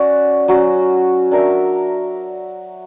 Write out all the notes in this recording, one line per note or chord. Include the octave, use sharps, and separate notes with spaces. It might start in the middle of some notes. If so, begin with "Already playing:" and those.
Already playing: C#4 F#4 D5
F#3 C#4 F#4
D4 A#4 E5